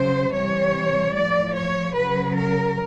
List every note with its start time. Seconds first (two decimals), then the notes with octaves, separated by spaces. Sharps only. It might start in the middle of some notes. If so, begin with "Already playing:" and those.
Already playing: C#3 F#3 C5
0.32 C3 E3 G3 C#5
1.14 A2 F3 D5
1.55 C#5
1.95 C#3 F#3 B4
2.36 A#4